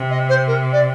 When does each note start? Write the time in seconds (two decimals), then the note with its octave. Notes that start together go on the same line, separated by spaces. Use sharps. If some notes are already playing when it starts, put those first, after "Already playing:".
Already playing: C3
0.10 D#5
0.29 C5
0.48 A#4
0.73 D5